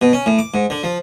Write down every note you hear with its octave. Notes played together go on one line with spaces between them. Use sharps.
B2
C#4
A2
D6
G#2
D3
F3